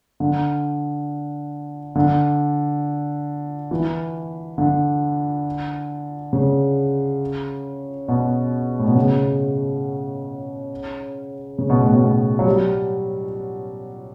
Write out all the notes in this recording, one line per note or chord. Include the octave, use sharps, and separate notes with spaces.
D3
D3
E3
D3
C#3
B2
A2
B2
C#3
C#3
B2
A2
B2
F#3
G3